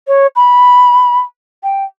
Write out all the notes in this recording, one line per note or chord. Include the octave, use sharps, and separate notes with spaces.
C#5
B5
G5